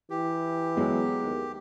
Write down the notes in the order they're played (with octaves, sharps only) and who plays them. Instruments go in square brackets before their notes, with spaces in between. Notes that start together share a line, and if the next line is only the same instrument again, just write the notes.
[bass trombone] E3 [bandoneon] G4
[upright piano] F#3 G#3 B3
[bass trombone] D#2